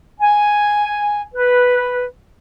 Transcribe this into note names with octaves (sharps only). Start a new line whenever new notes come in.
G#5
B4